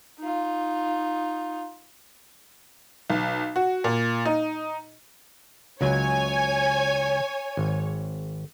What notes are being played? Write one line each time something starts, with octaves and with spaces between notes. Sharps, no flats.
D#4 F4
B1
F#4
A#2
D#4
C#2 F#3 C#5 G#5
G#1